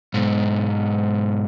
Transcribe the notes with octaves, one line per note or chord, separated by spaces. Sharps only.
G#2 B2